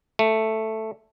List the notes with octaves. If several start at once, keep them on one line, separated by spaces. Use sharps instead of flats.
A3